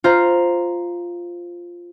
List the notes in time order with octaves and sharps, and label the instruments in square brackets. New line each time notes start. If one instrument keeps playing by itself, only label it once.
[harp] F4 C5 A#5